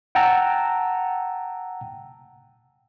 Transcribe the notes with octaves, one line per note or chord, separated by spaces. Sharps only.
F#5 G5 A5 A#5 E6